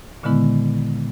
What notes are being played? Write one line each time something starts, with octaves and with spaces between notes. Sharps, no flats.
A#2 D3 D#3 G#3 B3 E4